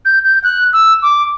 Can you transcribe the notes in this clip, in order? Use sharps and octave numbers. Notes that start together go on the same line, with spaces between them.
G6
G6
F#6
E6
D6